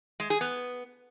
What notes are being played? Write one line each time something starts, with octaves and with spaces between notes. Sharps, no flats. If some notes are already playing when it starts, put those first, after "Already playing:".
G#3
G#4
B3